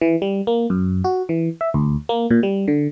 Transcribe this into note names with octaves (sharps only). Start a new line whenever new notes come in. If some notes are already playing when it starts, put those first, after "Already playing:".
E3
G3
A#3
F#2
F#4
E3
E5
D2
A#3
A#2
G3
D3